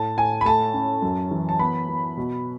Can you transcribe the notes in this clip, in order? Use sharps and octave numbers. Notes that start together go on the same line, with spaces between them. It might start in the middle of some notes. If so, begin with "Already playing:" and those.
Already playing: A2 A5
A2 G#5
B5
A3 A5
C#4
F#2
E3
A5
B3 B5
B3
B2